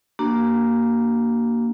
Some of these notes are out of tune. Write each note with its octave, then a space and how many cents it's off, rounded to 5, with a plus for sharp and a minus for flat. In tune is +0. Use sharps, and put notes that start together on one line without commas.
A#3 +0 D4 -5 F#4 +45